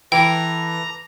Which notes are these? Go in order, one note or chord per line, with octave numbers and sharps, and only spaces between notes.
E3 A4 B4 G5 A#5 D6